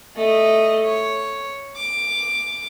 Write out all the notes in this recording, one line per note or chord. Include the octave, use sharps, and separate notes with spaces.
A3 D#5
C#5
D6